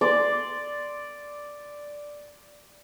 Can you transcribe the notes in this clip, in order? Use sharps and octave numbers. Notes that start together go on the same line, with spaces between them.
D5 C6 D6